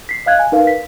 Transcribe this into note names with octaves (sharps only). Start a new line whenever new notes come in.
B6 C7
D#5 F5 F#6 G#6
G#5
D#4 A#4 B4 F5
B6